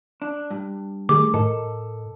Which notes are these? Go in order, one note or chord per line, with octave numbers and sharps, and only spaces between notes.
D4
G2
D#3 G3 A3 G#4 D6
A2 A4 A#4 D#5